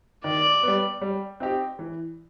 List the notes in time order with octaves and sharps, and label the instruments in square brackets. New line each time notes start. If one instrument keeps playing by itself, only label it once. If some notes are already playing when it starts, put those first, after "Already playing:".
[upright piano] D#3 [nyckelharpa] D5
[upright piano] G3 B3
G3
C4 D#4 G4
E3